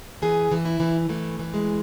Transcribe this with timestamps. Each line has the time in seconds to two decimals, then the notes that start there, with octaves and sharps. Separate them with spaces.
0.22 E3 G#4
0.52 E3
0.65 E4
0.80 E3
1.09 E3 A3
1.39 E3
1.54 G#3